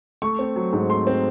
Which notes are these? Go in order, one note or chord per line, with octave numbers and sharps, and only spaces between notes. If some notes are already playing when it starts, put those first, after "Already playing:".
A3 C#6
C4
F#3
G#2
A3 C6
C4